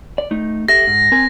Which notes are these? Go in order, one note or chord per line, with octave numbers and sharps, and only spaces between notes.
D5
A3 D#4
G4 A4 E5 A#6
G#2
C4 A#4 G#5